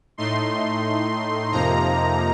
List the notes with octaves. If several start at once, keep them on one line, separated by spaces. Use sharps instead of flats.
A2 A3 D#4 C6
F2 C3 F3 A#3 D#4 A#5